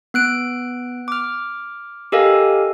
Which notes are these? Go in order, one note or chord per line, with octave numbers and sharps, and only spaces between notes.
B3 F#6 D7
D6 F6
G4 A4 A#4 D#5 F5 G#5